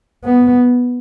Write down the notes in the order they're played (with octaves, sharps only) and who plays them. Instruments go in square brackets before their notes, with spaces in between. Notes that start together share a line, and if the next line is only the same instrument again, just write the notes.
[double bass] B3